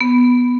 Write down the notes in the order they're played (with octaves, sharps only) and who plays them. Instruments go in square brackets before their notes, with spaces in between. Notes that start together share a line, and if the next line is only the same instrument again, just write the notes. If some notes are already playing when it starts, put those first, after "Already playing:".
[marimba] B3